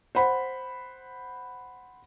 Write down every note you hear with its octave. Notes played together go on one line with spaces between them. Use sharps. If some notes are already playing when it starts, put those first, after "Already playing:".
C5 F#5 B5